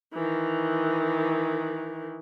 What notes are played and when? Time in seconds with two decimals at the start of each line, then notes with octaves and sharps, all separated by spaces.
0.14 D#3 E3